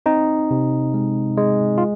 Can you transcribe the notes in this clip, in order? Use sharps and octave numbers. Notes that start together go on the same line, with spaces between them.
C4 D#4
C3
G#3
G#3
F4